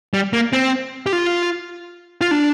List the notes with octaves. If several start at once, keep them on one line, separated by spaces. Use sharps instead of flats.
G3
A#3
C4
G4
F4
F4
D4